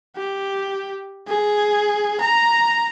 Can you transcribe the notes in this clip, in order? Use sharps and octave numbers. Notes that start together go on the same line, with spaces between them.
G4
G#4
A#5